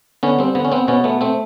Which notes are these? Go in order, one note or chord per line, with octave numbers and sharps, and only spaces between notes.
D3 B3 C#4
G3 C4
D3 B3
C#4
B3 C4
B2 B3 C#4
A3 B3
A3 C4